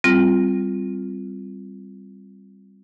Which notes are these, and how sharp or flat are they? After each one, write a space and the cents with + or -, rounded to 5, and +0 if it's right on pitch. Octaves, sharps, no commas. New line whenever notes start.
G3 +0 C4 +0 F4 +0